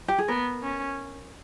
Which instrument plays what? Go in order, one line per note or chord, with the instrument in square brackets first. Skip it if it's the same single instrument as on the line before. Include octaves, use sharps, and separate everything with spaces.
[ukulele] G4
G#4
[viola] B3 [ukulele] A#4
[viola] C#4